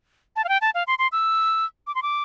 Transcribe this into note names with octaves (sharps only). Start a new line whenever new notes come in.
A5
F5
G5
A5
F5
C6
C6
E6
D6
C6
D6